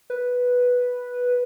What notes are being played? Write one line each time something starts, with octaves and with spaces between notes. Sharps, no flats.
B4